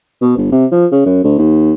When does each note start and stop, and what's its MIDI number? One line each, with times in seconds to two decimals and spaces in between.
0.22 0.36 47
0.37 0.51 31
0.52 0.66 48
0.72 0.86 53
0.92 1.02 49
1.06 1.23 42
1.24 1.36 38
1.39 1.74 39